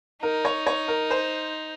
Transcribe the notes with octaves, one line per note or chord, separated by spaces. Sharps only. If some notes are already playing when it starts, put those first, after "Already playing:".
D#4 A#4
C#5
C#5
A#4
C5